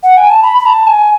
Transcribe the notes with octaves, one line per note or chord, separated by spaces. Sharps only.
F#5
G#5
A5
B5
B5
A5
G#5